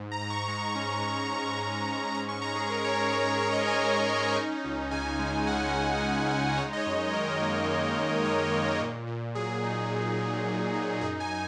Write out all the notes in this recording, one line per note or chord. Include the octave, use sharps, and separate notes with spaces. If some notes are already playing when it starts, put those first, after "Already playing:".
Already playing: G#2
A#5
G#2
C#6
G#3 C#6
C#4
G#2
G#2
G#3 C#6
C#4
G#2 A#5
C#6
G#2 A#5
G#4
G#3 A#4
C#5
C#4 A#4
C#5
G#2 C#5
C#5
G#2 D#5
G#5
G#3 G#5
C#4
D#4
C#2
C#3 G#5
G#3
D#4 F#5
C#2
C#3
G#3
D#4 C#5
D#5
C#5
F#2
D#3 A#4
A#3
D#4
F#2
D#3 C#5
A#3
A#2
A#2
F#3 G#4
D#4
A#2
A#2
F#3
D#4
F#2 G#4
G#5